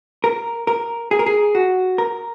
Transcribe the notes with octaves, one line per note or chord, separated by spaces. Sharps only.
A#4
A#4
G#4
A#4
G#4
F#4
A#4